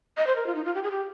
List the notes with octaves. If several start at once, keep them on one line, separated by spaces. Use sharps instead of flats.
D#5
C5
A#4
F4
D#4
F4
G4
G#4
G4